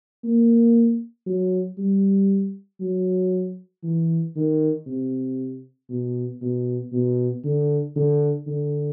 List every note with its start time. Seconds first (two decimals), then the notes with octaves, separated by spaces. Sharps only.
0.24 A#3
1.26 F#3
1.78 G3
2.80 F#3
3.83 E3
4.36 D#3
4.87 C3
5.90 B2
6.41 B2
6.92 B2
7.44 D3
7.96 D3
8.47 D3